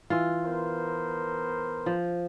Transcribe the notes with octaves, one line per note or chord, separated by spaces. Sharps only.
E3 F4
B3 A#4 C5
F3